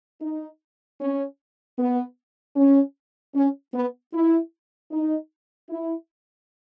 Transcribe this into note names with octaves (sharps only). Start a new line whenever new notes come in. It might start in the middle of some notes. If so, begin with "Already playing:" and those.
D#4
C#4
B3
C#4
C#4
B3
E4
D#4
E4